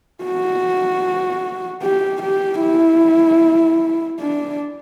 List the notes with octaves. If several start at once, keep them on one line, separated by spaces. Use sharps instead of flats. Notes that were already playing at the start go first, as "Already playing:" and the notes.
F#4
G4
G4
E4
D4